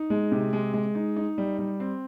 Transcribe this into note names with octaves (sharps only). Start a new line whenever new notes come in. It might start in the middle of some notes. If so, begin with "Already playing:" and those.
Already playing: D#4
G#3
C3
G#3
G#3
D#4
D#4
G3
G3
C4